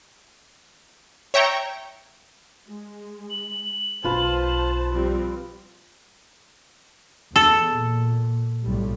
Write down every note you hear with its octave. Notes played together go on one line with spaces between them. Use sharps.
C#5 E5 G5 A#5 C#6
G#3
F#7
B1 F4 B4 C5 A5
F3 G3 C4
E2 A4
A#2
B1 A2 G3